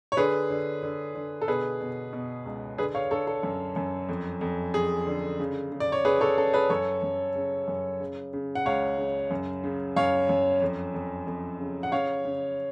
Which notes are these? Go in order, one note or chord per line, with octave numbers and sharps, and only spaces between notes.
C#5
D3 G#4 B4
D3
D3
D3
A4
B2 G#4 B4
B2
B2
C#2
D3 G#4 B4
C#5 F5
D3 A4 C#5
A4
F#2
F#2
F2
F2
F2 G#4
D3
C#3
C#3
D5
C#5
C#3 G#4 B4
A4 C#5
C#3 A4
G#4 B4
F#2 A4 C#5
F#2
C#3
F#2
C#3
C#3
F#5
C#2 C#5 F5
C#3
F#2
C#3
F#2 C#5 F5
F#2
F2
F2
F2
C#3
F#5
C#3 C#5 F5
C#3